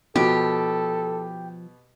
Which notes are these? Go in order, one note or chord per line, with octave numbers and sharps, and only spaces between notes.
B2 F3 G4 A4